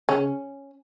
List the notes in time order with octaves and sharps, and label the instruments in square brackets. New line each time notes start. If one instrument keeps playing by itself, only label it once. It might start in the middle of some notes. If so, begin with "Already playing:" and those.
[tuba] C#3 [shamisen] C#4